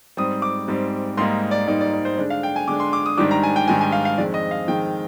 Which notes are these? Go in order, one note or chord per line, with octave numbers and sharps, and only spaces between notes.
G#2 G3 C4 D#6
D6
G#2 G3 C4
G#2 G3 A#3 D#4 C6
D5
G#2 G3 A#3 D#4 D5
D5
D5
C5
D3 G#3 D4 D5
F5
G5
G#5
D3 G#3 D4 D6
C6
D6
D#6
G#2 D#3 G3 D4 D6
A#5
G#5
G5
G#2 D#3 G3 D4 G#5
G#5
F5
F5
F2 D#3 G#3 D5
D#5
F5
F2 D#3 G#3 G5